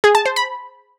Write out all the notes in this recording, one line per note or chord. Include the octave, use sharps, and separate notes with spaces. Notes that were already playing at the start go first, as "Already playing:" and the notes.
G#4
A5
C5
B5